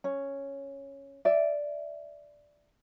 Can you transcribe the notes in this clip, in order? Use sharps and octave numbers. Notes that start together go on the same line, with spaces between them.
C#4
D5 E5